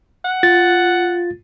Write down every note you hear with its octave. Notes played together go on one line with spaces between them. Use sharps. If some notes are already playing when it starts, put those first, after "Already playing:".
F#5
F4 A6